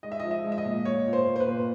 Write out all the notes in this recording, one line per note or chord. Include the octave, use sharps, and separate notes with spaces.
G#3 D#5
E5
F3 D#5
E5
G#3
E5
D#5
A#2
A#2 C#5
A#2
C5
A#2
C5
B4
A#2